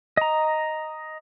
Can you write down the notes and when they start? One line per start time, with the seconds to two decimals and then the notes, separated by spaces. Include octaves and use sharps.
0.17 D#5 A#5